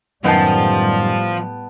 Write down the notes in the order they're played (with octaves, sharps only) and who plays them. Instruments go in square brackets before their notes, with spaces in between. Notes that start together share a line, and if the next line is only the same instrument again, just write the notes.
[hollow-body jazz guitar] F#2 D#3 [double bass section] A2 G3 [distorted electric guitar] F3 [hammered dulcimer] B3 G5 A5